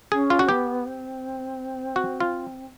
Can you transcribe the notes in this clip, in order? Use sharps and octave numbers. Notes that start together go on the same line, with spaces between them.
C#4 G#4
F4
F#4
B3 G4
C4
F#4
F4